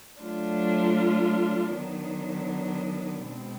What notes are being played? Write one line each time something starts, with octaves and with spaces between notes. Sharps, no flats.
F#3 A3 D4 F4
D#3 F#3 B3 D4
B2 G#3 C4